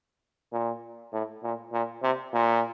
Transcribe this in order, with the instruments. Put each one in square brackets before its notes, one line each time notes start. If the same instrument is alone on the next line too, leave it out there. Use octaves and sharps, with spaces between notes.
[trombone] A#2
A2
A#2
A#2
C3
A#2